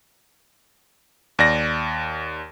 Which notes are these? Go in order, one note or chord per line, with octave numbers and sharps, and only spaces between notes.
D#2 D5 A#6